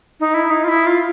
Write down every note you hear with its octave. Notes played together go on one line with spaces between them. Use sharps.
D#4
E4
D#4
F4
E4
F4